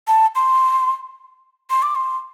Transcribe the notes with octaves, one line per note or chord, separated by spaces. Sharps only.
A5
C6
C6
D6
C6